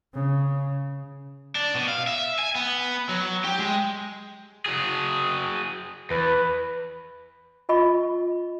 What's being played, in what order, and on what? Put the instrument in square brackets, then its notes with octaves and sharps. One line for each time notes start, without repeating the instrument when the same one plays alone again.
[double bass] C#3
[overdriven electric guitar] D4
B2
F5
E5
G#5
B3
F#3
G4
G#3
F#3 G#4
[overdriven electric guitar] E2 [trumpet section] B4
[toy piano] F4 D#5 B5 C#6